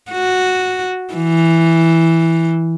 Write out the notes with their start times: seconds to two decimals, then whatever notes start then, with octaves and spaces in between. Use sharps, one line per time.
0.11 F#4
1.14 E3